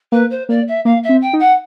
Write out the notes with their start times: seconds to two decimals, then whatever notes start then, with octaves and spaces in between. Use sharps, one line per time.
0.12 A#3 B4
0.30 C5
0.49 A#3 D5
0.67 E5
0.85 A#3 F5
1.03 E5
1.09 C4
1.21 G5
1.33 D#4
1.39 F#5